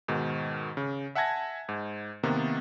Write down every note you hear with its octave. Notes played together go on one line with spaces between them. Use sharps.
G#2 B2 D#3
C#3
E5 F#5 G#5 A5 G#6 A#6
G#2
C3 D#3 A#3 B3